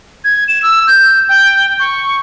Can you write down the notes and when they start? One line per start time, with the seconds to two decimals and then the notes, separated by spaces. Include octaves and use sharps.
0.24 G#6
0.48 E7
0.63 E6
0.87 G6
1.29 G5
1.80 C#6